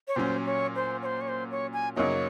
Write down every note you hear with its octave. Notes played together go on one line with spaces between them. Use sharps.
C#5
A#2 F#3 C#4 C5
C#5
C5
C#5
C5
C#5
C5
C#5
G#5
F#2 C#3 F#3 A#3 D#4 C#5